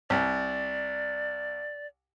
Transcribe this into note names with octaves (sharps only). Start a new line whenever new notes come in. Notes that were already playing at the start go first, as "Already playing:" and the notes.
C2 D5